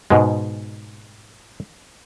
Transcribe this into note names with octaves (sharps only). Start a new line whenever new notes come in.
G#2 B2 G#3